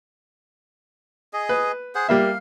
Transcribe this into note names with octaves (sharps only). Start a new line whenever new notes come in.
G#4 D#5
B4
G#4 C5 F#5
G3 A#3 E5 F5